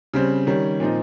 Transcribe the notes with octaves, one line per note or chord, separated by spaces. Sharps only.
C#3 G3 C4
D#3 G3 C#4
A#2 F3 C4 D#4